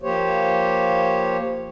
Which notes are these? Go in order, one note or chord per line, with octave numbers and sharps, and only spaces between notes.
F3 A#3 G4 C5 C#5